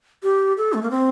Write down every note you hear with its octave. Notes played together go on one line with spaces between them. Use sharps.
G4
A4
A3
A#3
C4